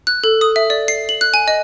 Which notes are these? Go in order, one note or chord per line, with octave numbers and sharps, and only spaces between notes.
F#6
A4
D#6
E5
D5
C7
F#7
F#6
G#5
D#5